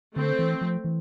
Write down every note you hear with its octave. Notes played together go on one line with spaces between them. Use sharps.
D3 A3 C4
E3
F3
E3